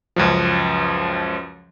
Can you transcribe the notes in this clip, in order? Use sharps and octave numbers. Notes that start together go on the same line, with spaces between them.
C#2 F#2 F3